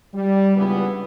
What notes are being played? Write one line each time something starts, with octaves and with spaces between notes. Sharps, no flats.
G3
C#2 G2 E3 B3